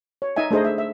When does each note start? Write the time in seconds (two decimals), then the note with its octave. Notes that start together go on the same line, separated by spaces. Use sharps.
0.22 C#5
0.36 D#4 D#5 E5 G#5
0.51 A3 D4 D#4 G#4 C5 D#5
0.65 E5
0.78 E5